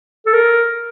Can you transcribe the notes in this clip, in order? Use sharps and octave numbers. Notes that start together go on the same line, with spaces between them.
A4
A#4